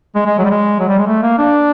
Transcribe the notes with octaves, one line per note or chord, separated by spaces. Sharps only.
G#3
G#3
F#3
G3
G#3
F#3
G3
G#3
A3
A#3
D4